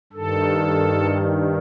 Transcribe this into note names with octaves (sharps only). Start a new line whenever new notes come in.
G2 D#3 A4